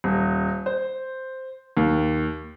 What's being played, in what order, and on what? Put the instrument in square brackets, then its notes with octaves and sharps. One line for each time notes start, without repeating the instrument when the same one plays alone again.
[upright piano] D#1
C5
D#2